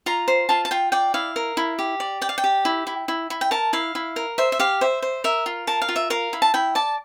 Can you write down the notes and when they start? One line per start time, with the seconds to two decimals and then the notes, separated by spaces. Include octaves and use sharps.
0.06 F4 A#5
0.28 C5
0.49 F4 A5
0.65 A5
0.71 F4 G5
0.92 D5 G5
1.14 E4 F5
1.36 A#4
1.57 E4
1.79 G4
2.00 D5
2.21 D5 G5
2.29 F5
2.38 G5
2.44 G4
2.65 E4
2.87 E4
3.08 E4
3.30 E4
3.41 G5
3.51 A#4 A5
3.73 E4 F5
3.95 E4
4.16 A#4
4.38 C5 E5
4.52 E5
4.59 G4 F5
4.81 C5 E5
5.02 C5
5.24 A#4 E5
5.46 F4
5.67 A#4 A5
5.82 F5
5.89 F4
5.96 E5
6.10 A#4 F5
6.33 E4
6.42 A5
6.54 E4 G5
6.75 D5 A5